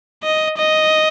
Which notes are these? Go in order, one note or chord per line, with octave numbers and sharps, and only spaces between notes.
D#5
D#5